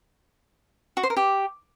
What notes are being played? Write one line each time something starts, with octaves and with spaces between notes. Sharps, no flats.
F#4
C5
A#4
G4